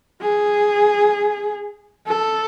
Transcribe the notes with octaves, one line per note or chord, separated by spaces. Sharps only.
G#4
A4